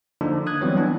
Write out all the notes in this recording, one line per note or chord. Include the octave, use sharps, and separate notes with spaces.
D3 F3 A#3 D4 D#4
D#6 F#6 G#6
E3 F#3 G3 B3 C4 C#5
E3 B3 D4